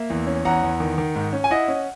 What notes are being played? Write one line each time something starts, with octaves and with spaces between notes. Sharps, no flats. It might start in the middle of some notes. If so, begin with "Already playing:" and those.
Already playing: A#3 E5
E2
C#4
E2 F#5 A#5
E2
D#3
D#3
G#2
C#4
G#5
E4 D#5 F#5
C#4